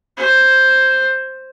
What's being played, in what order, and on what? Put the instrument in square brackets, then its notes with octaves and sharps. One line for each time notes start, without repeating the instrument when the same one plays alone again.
[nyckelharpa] C5